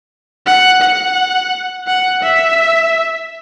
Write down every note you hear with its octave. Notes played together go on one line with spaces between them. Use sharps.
F#5
F#5
F#5
E5